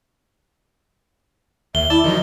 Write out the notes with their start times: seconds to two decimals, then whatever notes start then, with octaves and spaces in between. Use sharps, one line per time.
1.75 D#2 E5 G7
1.90 E4 D5 A5 E6
2.04 D#3 F3 F#3 D#5